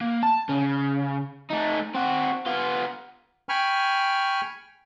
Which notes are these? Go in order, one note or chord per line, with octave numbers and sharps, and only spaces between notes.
A#3
A5
C#3
A3 D#4
C4 F#4
B3 F4
G5 G#5 B5 C#6 F6